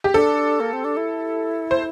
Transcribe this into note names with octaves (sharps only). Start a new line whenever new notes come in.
G4
D4 A4
A#3
C4
D4
E4
C5